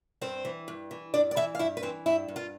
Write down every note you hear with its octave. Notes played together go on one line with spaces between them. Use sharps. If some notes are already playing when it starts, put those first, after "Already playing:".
G2 C4 C5
E3
G2
E3
G2 D4 D5
D5
E3 E4 E5
F5
G2 E4 E5
B4
E3 C4 C5
G2 E4 E5
G2
F4 F5